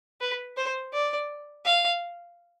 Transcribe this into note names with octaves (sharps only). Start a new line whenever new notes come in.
B4
C5
D5
F5